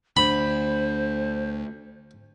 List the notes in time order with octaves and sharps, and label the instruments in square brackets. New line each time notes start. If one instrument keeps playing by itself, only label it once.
[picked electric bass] D2 [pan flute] C5 [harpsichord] B5